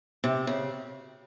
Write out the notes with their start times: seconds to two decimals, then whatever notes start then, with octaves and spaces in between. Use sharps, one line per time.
0.24 C3
0.47 C#3